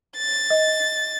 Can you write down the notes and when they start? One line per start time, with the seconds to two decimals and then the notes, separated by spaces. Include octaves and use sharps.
0.18 A6
0.50 D#5